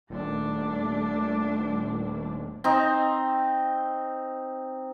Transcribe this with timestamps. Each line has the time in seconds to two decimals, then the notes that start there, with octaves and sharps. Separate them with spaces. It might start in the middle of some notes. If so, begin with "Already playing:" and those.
0.10 D#1 A3 D4
2.64 C4 D#4